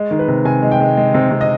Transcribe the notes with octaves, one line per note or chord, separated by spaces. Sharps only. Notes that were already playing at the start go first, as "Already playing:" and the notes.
Already playing: G#3
D#3
B4
C3
C3 G#5
G#3
G5
G#3
G#3
C3
C3
D#5